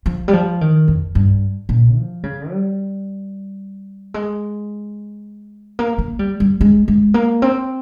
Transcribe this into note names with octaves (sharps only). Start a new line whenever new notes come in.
F3
G3
F3
D#3
F2
G2
A#2
F3
C#3
G3
G#3
A#3
A#3
G3
G3
G#3
G#3
A#3
C4